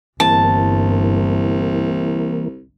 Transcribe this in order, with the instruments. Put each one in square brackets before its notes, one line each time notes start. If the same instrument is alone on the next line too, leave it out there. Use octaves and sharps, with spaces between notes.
[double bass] G1 G2 [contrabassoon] C2 [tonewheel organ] E3 A#3 [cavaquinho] A5